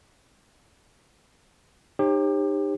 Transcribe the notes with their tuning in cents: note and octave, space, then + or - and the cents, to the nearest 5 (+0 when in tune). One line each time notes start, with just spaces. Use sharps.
D#4 -30 G4 +25 C#5 -45